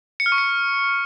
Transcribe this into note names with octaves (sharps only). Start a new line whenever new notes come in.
C#7
F6
C#6
C#7